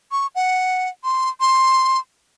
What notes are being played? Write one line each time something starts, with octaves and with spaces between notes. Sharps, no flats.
C#6
F#5
C6
C6